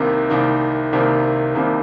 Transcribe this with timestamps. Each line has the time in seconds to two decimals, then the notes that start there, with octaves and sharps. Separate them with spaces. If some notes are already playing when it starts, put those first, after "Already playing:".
Already playing: C2 C3 D#3 A#3
0.30 C2 C3 D#3 A#3
0.93 C2 C3 D#3 A#3
1.55 C2 C3 D#3 A#3